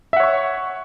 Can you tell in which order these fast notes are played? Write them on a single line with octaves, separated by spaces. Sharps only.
E5 F#5 C#5 C#6